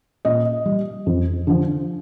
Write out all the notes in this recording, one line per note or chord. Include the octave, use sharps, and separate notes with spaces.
A#2 D#5
G3
F2
D3 F3